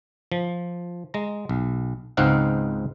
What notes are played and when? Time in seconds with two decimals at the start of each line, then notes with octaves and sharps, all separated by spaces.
0.32 F3
1.14 G#3 A#5
1.49 B1
2.17 C#2 G#2 C4 D#4 F5 F#5